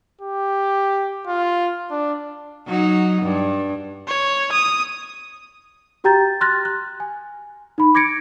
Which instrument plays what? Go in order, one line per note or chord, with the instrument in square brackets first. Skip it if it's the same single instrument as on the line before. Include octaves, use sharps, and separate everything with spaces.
[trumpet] G4
F4
D4
[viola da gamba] F#3 D#4
G2
[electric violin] C#5
D#6
[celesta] F#4 G4 G5 A#5 G6 A6
C6 F6 F#6 A6 A#6
F#6
G#5
D#4 B5
D6 G#6 A#6 C#7 D7